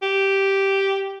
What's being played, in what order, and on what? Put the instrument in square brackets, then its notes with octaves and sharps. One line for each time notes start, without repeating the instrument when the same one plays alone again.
[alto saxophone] G4